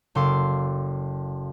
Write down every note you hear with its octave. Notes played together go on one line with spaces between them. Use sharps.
F#1 A4 F5 C6 D6